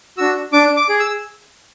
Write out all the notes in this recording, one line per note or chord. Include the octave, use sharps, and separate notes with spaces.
D4 F#4 E6
D4 D6
D6
G#4
E6